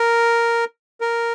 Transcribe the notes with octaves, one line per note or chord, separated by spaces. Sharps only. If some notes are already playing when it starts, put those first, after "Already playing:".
Already playing: A#4
A#4